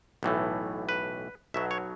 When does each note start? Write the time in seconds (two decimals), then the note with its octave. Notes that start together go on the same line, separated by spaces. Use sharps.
0.23 B1 A2 E3 A3
0.89 B4
1.54 B1 B2 F#3 E5
1.71 C#5